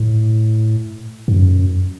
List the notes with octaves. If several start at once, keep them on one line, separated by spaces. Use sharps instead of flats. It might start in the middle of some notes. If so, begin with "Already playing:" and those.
Already playing: A2
G#2
F#2